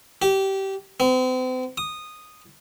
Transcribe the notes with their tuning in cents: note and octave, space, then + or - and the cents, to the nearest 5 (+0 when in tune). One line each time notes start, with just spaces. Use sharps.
G4 -20
C4 -40
D#6 -10